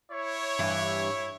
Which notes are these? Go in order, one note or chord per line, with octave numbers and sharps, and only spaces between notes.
E4 C#5
G2 E3